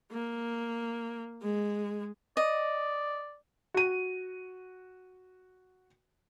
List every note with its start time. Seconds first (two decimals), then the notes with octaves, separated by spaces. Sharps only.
0.12 A#3
1.42 G#3
2.37 D5 D#5
3.74 F#4 D#7